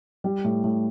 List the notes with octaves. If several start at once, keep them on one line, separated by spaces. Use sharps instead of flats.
G3
A2
A2